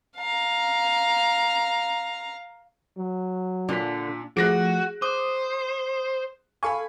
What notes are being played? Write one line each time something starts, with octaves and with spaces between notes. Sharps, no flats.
F5 A#5
F#3
A#2 D3 D4 B6
F3 A3 F#4 G#4 F#6 A#6 D7
C5 D6 D#6
A4 F5 G#5 B5 C#6